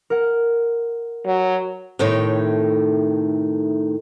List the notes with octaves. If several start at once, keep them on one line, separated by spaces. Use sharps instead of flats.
A#4 F#5
F#3
A2 C3 D#3 A3 D#4 C#5